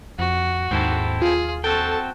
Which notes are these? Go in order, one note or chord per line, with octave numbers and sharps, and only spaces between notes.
F2 F#4
D#2 G#2 C4 E4 A4
F4 G#4
C4 F#4 A4 G5 A5 C#6